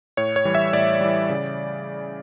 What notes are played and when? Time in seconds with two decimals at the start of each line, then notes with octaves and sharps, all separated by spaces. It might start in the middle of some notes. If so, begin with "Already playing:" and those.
0.17 A2 C#5
0.36 C#5
0.45 E3 G3
0.55 E5
0.73 A2 D5
1.01 E3 G3
1.30 C#3